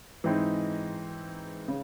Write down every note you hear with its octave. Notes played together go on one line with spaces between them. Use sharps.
G#2 E3 G#3 C4 D#4
C#3